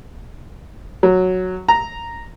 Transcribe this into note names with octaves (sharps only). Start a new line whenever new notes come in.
F#3
A#5